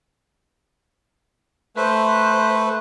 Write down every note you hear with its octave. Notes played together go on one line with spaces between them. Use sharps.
A3 B4 C5